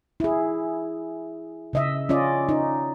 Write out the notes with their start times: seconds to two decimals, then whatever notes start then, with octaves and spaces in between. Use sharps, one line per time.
0.20 E4 G#4
1.73 C#3 D#5 E5
2.09 C#4 F4 D5 D#5
2.49 D#4